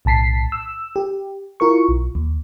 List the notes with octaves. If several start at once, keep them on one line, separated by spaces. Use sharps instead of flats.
B1 A2 A5 B6 C7
E6
G4
E4 F4 A#4 C#6
B1
D#2